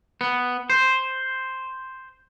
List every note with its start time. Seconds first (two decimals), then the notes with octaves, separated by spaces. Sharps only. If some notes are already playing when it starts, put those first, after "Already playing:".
0.21 B3
0.70 C5